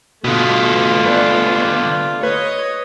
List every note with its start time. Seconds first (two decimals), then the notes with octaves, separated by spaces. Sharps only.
0.24 B2 D3 A3 B3 F4
1.06 B4 D5
2.23 B4 C#5 D#5